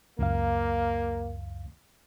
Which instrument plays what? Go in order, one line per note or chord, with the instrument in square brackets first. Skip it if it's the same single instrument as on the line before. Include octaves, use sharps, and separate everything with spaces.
[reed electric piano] C#2 F#2 F5 [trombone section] A#3